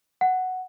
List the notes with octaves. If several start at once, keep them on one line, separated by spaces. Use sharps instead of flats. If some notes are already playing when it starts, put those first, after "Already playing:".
F#5